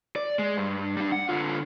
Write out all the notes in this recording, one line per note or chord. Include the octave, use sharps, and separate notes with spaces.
D5
G#3
G2
G3 D4
F#5
D3 F4